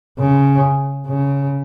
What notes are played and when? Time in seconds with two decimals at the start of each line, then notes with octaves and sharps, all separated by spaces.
0.19 C#3
1.07 C#3